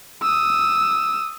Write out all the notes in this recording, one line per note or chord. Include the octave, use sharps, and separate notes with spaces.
D#6 E6